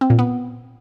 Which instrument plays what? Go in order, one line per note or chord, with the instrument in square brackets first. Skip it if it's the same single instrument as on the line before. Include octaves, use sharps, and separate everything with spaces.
[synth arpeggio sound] C4
A#2
B3